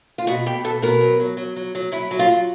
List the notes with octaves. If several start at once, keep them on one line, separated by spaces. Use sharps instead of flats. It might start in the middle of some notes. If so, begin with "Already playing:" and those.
F4
B2 F#4
B2 G4
B2 A4
B2 A#4
F#3
F#3
F#3
F#3
F#3
F#3 E4
F#3
F4
F#3